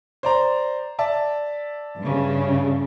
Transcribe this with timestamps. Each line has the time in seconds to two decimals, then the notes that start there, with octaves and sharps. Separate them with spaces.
0.23 C5 D5 A#5
0.99 D5 E5 A5
1.99 G2 C#3